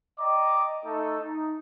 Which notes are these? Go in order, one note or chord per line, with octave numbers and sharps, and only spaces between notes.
D5 D#5 G5 A#5 D6
A3 D#4 A4
D#4